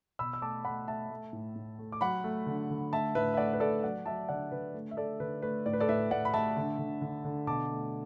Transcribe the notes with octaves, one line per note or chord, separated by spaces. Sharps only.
B2 B5 E6
E6
A3 A5 D6
A3 F#5 B5
A3 E5 A5
A3
A2
A2
A3
D6
F#3 F#5 B5
A3
D3
D3
A3 E5 A5
A2 B4 E5
E5
A3 D5 F#5
B4
A3 A4 D5
F#3 D5 F#5
F#3 E5 A5
D3 D5 F#5
D3 B4
A3
E5
A3 A4 D5
D3 B4
A3 B4
A2 D5
B4
A4 D5
A2 B4 E5
A2 D5 F#5
B5
A3 E5 A5
D3
D3
D3
D3
B2 A5 D6
A3